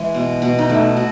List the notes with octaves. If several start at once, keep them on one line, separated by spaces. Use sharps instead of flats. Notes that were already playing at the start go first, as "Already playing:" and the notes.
Already playing: E3 G#3
B2
B2
D#4
A3 E4
F#4